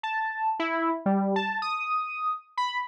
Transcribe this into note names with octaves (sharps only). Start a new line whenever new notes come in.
A5
E4
G3
A5
D#6
B5